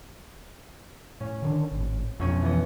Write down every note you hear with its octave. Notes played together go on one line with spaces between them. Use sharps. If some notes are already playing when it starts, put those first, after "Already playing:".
A2 C#4
D3 D#3 D4
G#1 A2
B1 F2 B2 C#4 D#7
E3 B3 D#5